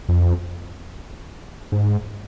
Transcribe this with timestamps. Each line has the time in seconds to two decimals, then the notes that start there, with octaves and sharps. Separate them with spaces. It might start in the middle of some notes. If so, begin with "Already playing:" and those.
0.09 F2
1.72 G#2